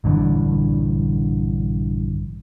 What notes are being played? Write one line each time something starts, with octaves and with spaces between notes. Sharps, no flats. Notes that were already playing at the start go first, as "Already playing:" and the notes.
A#1 G2 D3 E3